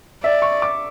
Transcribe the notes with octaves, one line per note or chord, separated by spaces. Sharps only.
D5 E5
C#6
D6